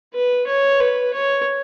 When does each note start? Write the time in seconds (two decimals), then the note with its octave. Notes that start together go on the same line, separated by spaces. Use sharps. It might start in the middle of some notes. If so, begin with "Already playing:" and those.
0.14 B4
0.47 C#5
0.80 B4
1.13 C#5